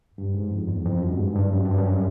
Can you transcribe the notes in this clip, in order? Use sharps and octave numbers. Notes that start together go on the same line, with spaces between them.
G2
G#2
F2
E2
F2
F#2
G2
G#2
G2
F#2
G2
F#2